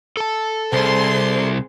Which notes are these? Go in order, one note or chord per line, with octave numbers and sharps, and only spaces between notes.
A4 A5
C2 G#4 C5 C6